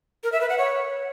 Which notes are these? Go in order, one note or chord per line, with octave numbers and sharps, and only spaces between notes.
A#4
E5
B4
F#5
C#5